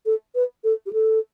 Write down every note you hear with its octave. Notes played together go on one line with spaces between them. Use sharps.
A4
B4
A4
G4
A4